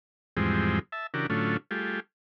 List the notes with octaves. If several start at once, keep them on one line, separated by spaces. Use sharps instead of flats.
E2 G#2 F3 G3 G#3 C4
E5 A5
C#3 E3 D4 F#4 G4 A#4
A2 D3 F#3 A3 C#4 F4
G3 A3 F4 G4 G#4